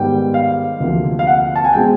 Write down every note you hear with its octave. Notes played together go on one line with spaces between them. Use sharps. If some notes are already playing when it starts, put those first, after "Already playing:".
Already playing: G#2 D#3 G3 B3 G5
F5
D2 C3 F3 A#3
F5
F#5
A5
G#5
B2 G#3 C4 G5